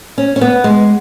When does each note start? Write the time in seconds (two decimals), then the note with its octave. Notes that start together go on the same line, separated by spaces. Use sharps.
0.18 C#4
0.36 C#4
0.41 B3
0.64 G#3